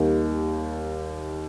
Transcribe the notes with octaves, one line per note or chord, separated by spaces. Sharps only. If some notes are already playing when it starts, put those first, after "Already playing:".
Already playing: D#2 D#3 G3